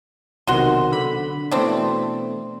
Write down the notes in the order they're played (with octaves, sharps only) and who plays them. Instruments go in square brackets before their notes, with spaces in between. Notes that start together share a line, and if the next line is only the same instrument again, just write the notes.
[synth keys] B1 C3 D#3 [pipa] F#4 C6
[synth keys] D3 B5
[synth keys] B2 E3 A3 [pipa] C4 D4